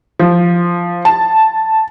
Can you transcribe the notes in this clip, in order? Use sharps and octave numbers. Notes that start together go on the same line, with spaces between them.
F3
A5